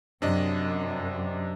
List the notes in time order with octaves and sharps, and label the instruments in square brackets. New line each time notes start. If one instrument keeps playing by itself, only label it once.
[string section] F#2 [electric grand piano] C3 D4 D#5